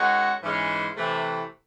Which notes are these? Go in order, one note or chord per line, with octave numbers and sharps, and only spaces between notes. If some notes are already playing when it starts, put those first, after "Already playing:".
Already playing: D#3 G#3 C#4 F#4
G#2 E3 G#3 C#4
C3 E3 A3